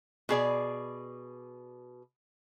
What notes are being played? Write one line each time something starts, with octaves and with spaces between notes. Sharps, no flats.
B2 G#4 D5